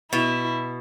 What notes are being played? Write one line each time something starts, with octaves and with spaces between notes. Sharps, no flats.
B2 E4